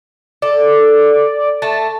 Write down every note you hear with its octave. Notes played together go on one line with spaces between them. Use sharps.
A4 D5
A3 A5